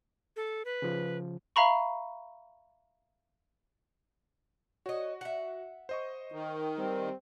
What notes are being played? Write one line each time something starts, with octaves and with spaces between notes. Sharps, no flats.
A4
B4
C#3 F3
E5 F5 A#5 B5 C#6
F#4 C#5 D#5
E5 F#5
C5 D#5 C#6
D#3
G3 C4